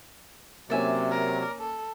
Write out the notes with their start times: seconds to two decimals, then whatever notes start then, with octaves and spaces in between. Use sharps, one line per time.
0.70 C3 F#3 A#3 C#4 D5 E5 G#5
1.11 A#4
1.59 A4